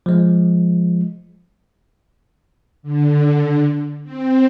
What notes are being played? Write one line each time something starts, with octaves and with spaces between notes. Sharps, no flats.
F3 G#3
D3
C4